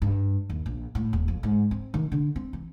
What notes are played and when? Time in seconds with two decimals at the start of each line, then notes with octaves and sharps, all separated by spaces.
0.02 G2
0.50 D#2
0.66 A#1
0.95 A2
1.13 D#1
1.28 F2
1.43 G#2
1.71 C4
1.94 D#3
2.12 D3
2.36 C4
2.53 E3